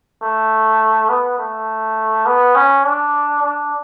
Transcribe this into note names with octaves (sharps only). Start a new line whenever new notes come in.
A3
B3
A3
B3
C#4
D4
D4